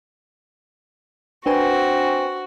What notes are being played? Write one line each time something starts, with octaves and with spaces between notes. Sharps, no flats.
C4 D4 F#4 B4 G#5